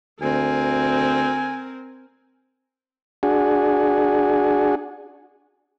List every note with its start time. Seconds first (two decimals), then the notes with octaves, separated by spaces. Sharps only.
0.22 D2 C4 A#4 G#5
3.23 D4 F#4 G#4